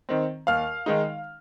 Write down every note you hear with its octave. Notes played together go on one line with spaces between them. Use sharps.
D#3 C4
D#2 F5 F6
D#3 G#3 D#4